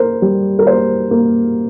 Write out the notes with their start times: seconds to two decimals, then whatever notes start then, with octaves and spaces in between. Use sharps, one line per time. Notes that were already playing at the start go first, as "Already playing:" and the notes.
Already playing: A#3 A#4 C5
0.22 G3
0.59 A#4
0.66 A#3 C5
1.11 A#3